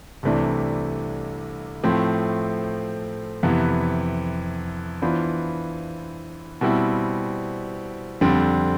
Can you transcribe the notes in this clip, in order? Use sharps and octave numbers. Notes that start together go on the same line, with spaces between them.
C2 C3 E3 A3 D4
A2 F3 A3 C4
F2 C3 E3 B3
E3 B3 D4 F4 C5
B2 G3 C4 E4
F2 D3 G3 C4